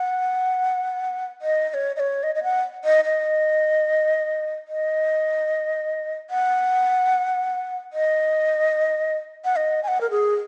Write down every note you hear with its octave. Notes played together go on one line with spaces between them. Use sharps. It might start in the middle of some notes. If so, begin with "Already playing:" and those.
Already playing: F#5
D#5
D#5
C#5
D#5
C#5
D#5
D#5
F#5
D#5
D#5
D#5
F#5
D#5
F#5
D#5
G#5
F#5
A#4
G#4